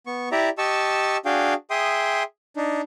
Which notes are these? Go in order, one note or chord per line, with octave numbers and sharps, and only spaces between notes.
B3 C#6
E4 G4 D5 E5 A#5
G4 D#5 A5 C#6 E6
D4 F#4 G#4 F5 G5
G#4 E5 G5 C6 D#6
D4 D#4